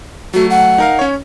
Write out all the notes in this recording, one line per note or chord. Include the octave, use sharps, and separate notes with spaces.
F#3 A3 F#4
F#5
D#4 A#4 F5
C#4 C#5